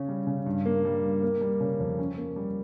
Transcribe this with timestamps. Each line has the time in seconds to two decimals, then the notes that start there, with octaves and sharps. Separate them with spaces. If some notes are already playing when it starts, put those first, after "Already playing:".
Already playing: C#3 C#4
0.09 G3
0.27 C#3
0.46 G2
0.66 A#3
0.85 G3
1.03 G2
1.22 A#3
1.41 G3
1.60 C#3
1.80 F2
1.99 C#4
2.18 A#3
2.36 G3